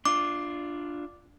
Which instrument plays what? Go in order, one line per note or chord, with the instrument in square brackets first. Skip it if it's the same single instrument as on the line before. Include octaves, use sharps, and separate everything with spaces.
[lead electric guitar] D4 F4 [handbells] D6